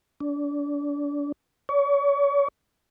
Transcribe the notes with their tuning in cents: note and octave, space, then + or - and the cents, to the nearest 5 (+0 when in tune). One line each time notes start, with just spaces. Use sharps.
D4 -30
C#5 +35